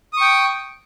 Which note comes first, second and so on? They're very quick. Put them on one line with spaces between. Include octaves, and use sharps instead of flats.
D#6 C#6 G5